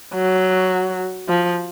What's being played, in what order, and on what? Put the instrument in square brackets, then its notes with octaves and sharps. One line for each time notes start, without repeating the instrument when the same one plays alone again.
[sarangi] F#3
F3